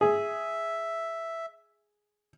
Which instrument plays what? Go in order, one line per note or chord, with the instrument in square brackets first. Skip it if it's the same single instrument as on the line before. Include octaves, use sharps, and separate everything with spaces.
[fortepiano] G#4 [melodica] E5